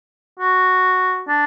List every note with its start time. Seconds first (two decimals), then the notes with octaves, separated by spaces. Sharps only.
0.40 F#4
1.28 D4